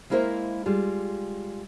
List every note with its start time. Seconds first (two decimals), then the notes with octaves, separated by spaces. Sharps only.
0.10 G#3 A#3 E4 A#4 C5 E5
0.66 G3 G#3 F4